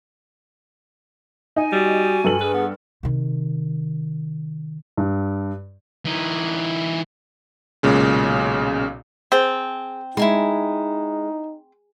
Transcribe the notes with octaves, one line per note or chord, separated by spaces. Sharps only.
D#4 G#5
G3 F#4
G2 A4 F#7
G#4 B4
B3
C3 D#3
G2
E3 D#4
B1 A#2 C#3 G#3
C4 G#4 G5 A5
G#3 D#4 E4 G#5 C6